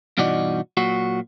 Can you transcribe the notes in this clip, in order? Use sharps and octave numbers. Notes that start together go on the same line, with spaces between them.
G2 B2 E3 D#4 F#4 D5
A#2 F#3 F#4